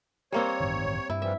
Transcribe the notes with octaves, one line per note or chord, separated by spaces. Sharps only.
G3 A#3 C4 C#5
A1 G2 D#3
G2 E4
E3 F3 G3 E5